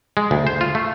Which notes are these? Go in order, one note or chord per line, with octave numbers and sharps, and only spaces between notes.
G#3
D2
C5
F4
A3